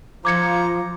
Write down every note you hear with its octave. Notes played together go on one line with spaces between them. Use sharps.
F3 F4 C5 A#5 D6 G#6 C#7